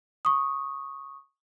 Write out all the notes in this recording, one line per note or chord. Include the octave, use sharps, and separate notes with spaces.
C#6 D#6